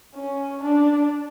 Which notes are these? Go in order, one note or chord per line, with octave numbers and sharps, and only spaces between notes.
C#4
D4